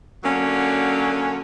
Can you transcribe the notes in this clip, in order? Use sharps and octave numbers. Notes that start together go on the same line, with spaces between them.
D3 F#3 A#3 C#4